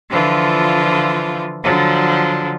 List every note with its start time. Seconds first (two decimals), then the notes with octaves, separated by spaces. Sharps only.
0.10 D3 E3 F3 F4
1.63 D3 F3 F#3